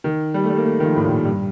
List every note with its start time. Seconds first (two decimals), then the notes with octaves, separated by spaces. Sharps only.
0.04 D#3
0.34 G3
0.44 A3
0.49 G3
0.57 A#3
0.64 A3
0.80 D#3
0.84 F3
0.96 A2
1.05 A#2
1.25 G2